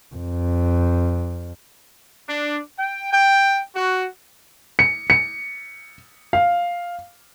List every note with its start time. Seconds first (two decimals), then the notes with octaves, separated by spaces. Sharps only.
0.15 F2
2.29 D4
2.79 G5
3.13 G5
3.76 F#4
4.79 C#7
5.10 C#7
6.33 F5